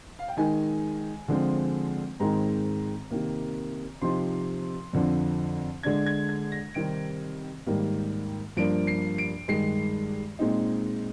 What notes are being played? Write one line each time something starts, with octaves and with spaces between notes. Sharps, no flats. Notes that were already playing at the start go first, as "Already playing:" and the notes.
F5
G5
D#3 G#3 D#4 G#5
D3 F3 G#3 C4
G#2 D#3 G#3 C4 D#4 A#5
C3 D#3 A#3
C3 F3 C4 D#4 C6
F2 D3 F3
D3 G#3 D4 G#6
G#6
G#6
A#6
C3 D#3 G3 C4 D#4 D7
G#2 D#3 G3 A#3
G2 F3 A#3 D4 D7
C7
D7
G2 D#3 G#3 C7
A#2 G#3 C4 D#4